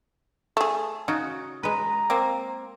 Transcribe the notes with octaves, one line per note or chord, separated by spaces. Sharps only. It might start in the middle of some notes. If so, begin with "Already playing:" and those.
A3 G#4
C#3 D#4 F#4
G#3 B4 A#5
A#3 C4